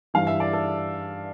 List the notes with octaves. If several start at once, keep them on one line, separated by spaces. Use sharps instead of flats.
G2 E3 F5
E5
D5
A4